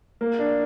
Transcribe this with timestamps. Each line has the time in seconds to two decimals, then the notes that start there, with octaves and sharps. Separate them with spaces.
0.21 A#3
0.39 D4